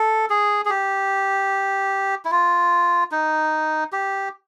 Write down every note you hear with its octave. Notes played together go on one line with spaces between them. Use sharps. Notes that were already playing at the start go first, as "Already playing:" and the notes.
Already playing: A4
G#4
G#4
G4
E4
F4
D#4
G4